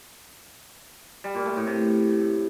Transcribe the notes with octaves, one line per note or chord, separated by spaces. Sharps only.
G3
A#2
A3
A2
C3